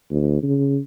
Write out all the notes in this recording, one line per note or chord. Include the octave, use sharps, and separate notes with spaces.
D2
C#3